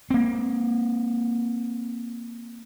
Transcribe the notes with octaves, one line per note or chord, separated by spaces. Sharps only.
A#3 C4